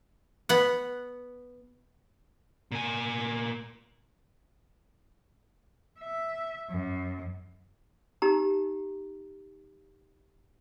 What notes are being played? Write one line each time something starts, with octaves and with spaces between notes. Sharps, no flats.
B3 F#5
A#2 G#5
E5
F#2
D#4 G4 A#5